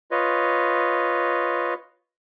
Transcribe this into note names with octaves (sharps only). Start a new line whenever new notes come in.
F4 B4 C#5 D#5